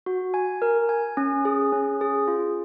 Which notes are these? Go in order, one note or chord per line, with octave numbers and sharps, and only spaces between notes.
F#4
G#5
A#4
G#5
C#4
G#4
C#4
G#4
F4